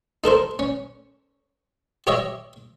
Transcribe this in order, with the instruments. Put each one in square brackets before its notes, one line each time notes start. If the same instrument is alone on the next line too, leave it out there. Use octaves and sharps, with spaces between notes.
[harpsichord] D#4 A4 A#4 C5
C#4
G4 C#5 D#5 E5